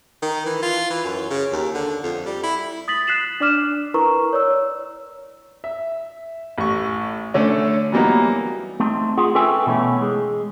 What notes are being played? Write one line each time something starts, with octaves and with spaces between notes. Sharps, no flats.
D#3
E3
F4
E3
F#2
C#3
D#2
D3
F2
G3
E4
D#6 A6 B6 F#7
F#6 B6 C7 E7 F#7
D4 D5 D6 F6 E7
E4 A#4 B4 A#5 C#6
C#5 D5 E6
E5
A1 C#6
D3 A3 C#4
E3 F#3 G3 A#3 B3 D#4
A3 C4 D#4
F4 G#4 F#5
C#4 A4 B4 E5 G5 G#5
B2 E3 A3 C#4
G#3